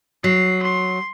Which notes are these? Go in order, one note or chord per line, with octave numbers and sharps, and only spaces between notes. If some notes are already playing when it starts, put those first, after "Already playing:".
F#3 C7
C6